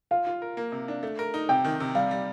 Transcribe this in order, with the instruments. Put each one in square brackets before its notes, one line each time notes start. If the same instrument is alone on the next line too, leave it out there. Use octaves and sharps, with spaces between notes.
[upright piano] F4 [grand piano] F5
[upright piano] F4
A#4
A#3
C3
D4
A3
A#4
D#4
[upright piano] C3 [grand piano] G5
[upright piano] D#3
C3
[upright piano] G3 [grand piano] F5
[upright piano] G3